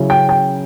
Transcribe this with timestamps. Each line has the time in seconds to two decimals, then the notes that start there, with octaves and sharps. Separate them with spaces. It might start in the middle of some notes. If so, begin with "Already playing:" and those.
Already playing: C#3 F#3 C#4 E4
0.10 G5
0.29 G5